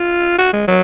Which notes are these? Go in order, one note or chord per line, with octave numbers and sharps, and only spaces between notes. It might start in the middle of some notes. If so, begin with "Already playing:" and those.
Already playing: F4
F#4
G#3
F#3